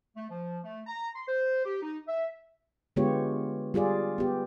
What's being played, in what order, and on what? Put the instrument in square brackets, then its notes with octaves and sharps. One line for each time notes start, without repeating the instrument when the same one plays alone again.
[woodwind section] A3
F3
A3
A#5
C6
C5
G4
D#4
E5
[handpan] D3 G#3 B3 F4 G4 C#5
G3 F4 G#4 D5
B3 G4